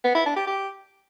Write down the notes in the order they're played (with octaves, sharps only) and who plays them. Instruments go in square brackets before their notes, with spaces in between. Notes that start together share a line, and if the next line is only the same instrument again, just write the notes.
[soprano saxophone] B3
E4
D4
G4
G4